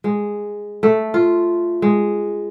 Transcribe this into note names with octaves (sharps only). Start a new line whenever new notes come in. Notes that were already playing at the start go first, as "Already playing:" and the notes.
G#3
A3
F4
G#3